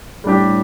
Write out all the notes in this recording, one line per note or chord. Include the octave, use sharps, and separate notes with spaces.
A2 G3 D4 G4